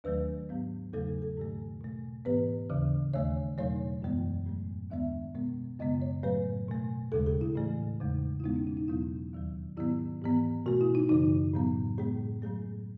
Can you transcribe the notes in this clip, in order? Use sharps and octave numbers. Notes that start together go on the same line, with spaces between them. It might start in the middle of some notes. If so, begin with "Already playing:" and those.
D#2 D#3 F#3 A3 B4
G#2 F#3 B3
E2 C#3 F#3 A3 A4
A4
G#2 D#3 A3
B2 A3
G#2 E3 B3 B4
D#2 C#3 E3
D#2 D#3 A3 C#5
E2 B2 F#3 A3 C#5
F#2 E3 G#3 B3
A2 F#3 A3
D#2 D#3 G#3 B3 E5
B2 G#3 B3
F#2 C#3 G#3 B3 D#5
C#5
A2 F#3 A3 B4
B2 A3
D#2 C#3 G#3 A4
G#4
E4
A2 E3 A3
E2 C#3 G#3
E4
E2 B2 G#3 B3 D#4
C#4
D#4
D#4
E2 B2 F#3 B3 E4
D#2 D#3 F#3
G#2 D#3 F#3 B3 E4
G#2 E3 B3
B2 A3 F#4
E4
D#4
F#2 C#3 E3 D#4
A2 F#3 B3
A2 G#3 B3 G#4
A2 F#3 A3 G#4